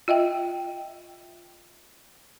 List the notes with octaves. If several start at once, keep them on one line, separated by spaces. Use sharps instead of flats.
F4 D#5 E5 G5